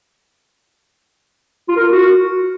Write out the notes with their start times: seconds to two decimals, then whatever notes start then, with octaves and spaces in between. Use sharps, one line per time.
1.69 F4
1.76 A#4
1.84 F4
1.92 F#4